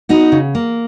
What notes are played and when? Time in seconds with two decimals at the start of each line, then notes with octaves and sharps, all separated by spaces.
0.09 B3 D#4 F#4
0.32 C#3
0.55 A#3